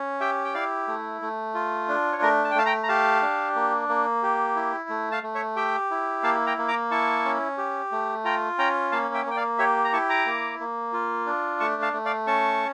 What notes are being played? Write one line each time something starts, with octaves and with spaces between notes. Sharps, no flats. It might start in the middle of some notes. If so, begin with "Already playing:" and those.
Already playing: C#4
G4 E5 G5
G5
E4 D5 F5
A3
A3
F4
D4
C#5
A3 A#4
A5
G5
A3 F5 A5
G5 A#5
A#5
G4 F5 A5
D4
A#3
A#3
G4
E4
A3
F5 A5
A3
C#5 E5
G4 E5 G5
E4
A#3 F5 A5
G5 A#5
A#3
A#5 D6
E4 A5 C#6
C#4
G4
A3
F4 G5 A#5
C#4 G5 A#5
A#3 F5 A5
E5 G5
A#3 G5
D5 F5
G4 C#5 E5
A#5
E4 A5 C#6
A#5 D6
A#3
A#3
F4
D4
A3 A5 C#6
F5 A5
A3
D5 F5
C#4 A5 C#6